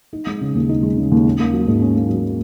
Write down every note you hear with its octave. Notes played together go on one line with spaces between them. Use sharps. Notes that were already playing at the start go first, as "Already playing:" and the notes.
D#4
G#3
C#3
D#2
D#4
G#3
C#3
D#2
C#4
A#3
F#3
G#2
C#4
A#3
F#3